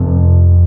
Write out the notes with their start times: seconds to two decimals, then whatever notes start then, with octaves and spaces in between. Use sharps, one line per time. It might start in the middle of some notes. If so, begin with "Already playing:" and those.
Already playing: F2 C3 C4